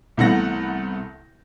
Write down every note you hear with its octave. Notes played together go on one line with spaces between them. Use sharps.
C2 E3 A3 B3 F#5 A#6